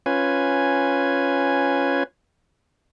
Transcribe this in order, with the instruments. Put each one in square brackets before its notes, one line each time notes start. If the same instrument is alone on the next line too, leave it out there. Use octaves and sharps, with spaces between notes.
[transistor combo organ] C#4 F4 B4 G#5